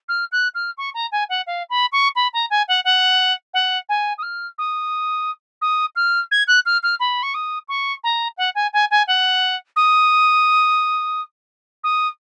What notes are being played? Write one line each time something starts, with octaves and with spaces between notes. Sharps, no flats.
F6
F#6
F6
C#6
A#5
G#5
F#5
F5
B5
C#6
B5
A#5
G#5
F#5
F#5
F#5
G#5
D#6
F6
D#6
D#6
F6
G#6
F#6
F6
F6
B5
C#6
D#6
C#6
A#5
F#5
G#5
G#5
G#5
F#5
D#6
D#6